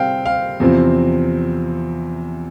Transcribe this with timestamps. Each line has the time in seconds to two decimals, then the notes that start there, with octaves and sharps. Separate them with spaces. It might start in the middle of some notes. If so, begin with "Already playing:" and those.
Already playing: C3 G3 C4 F5 G5
0.26 F5
0.60 E2 C3 F3 C4